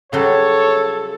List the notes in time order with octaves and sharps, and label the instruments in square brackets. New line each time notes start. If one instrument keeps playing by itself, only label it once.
[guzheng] C#3 F#3 G3 [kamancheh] A4 [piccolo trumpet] C#5